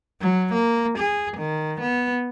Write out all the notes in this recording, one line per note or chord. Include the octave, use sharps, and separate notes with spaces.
F#3
A#3
G#4
D#3
B3